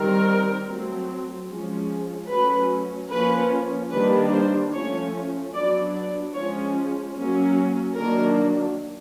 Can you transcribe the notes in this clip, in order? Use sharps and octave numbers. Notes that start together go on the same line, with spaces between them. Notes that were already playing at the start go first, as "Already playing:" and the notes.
Already playing: D#3 G3 C4 A#4
F#3 A3 C4
F3 G#3 C#4
F#3 A3 C#4 B4
F3 A#3 C#4 B4
D#3 G3 A#3 D4 B4
C5
F3 A3 C#4 C#5
F#3 B3 D4 D5
D5
F3 G#3 C#4 C#5
F#3 A#3 C#4
D#3 F#3 A#3 D4 A#4